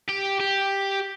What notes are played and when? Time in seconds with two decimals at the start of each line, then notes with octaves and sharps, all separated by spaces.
0.08 G4
0.40 G4